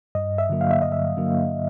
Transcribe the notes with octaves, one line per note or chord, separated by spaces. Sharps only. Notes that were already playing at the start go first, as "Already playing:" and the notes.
G2 D#5
E5
D3 F#3 A#3
F5
E5
G2 D#5
E5
D3 F#3 A#3